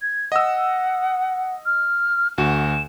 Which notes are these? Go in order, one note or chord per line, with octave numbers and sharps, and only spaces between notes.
G#6
D#5 F#5 E6
F6
D2 F#4 E7